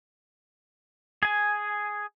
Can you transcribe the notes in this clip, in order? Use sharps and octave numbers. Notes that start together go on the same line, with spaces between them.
G#4 G#5